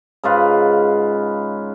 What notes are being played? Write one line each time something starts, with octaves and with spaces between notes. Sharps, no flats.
G#2 C#3 F4 B4